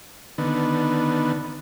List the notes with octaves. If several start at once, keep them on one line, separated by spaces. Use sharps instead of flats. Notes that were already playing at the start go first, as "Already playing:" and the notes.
D3 D#3 B3